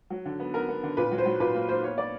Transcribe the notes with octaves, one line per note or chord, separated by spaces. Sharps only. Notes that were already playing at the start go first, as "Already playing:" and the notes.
F#3
D3
B3
B3 A#4
B3
D3
A#2 B4
F#3
C5
F#3
A#2 B4
A#3
A#3 C5
B3 C#5
B3 D5